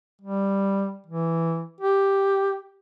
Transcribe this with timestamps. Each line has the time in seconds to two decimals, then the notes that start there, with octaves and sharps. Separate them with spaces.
0.21 G3
1.07 E3
1.81 G4